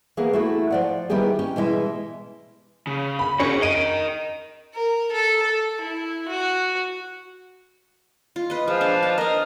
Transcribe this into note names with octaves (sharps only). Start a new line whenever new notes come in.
E3 A#3 B3 G#4 A#4
A3 E4 F#4 G#4
F3 D5 F#5
D#3 G3 B3 E4 G4 G#4
C#4 G4
B2 E3 G3 G#3 E4 E5
C#3
B5
C#4 F#4 G#4 C#7
A#4 D#5 D7 D#7
A#4
A4
A4
E4
F#4
F4
B4 D#5
F3 G#3
D4
A5
A#4 D#5 G#5